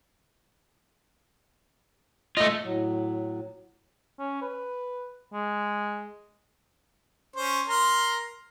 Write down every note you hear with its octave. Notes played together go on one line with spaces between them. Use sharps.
A3 F4 D#5
A2 F#3
C#4
B4
G#3
C#4 C5
A#4 A#5 C6